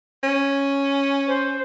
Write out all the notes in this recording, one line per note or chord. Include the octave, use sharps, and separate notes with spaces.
C#4
C5